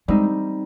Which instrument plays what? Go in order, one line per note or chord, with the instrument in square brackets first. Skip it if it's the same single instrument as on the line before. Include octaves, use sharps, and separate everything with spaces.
[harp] G3 C4 D#4 [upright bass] G#3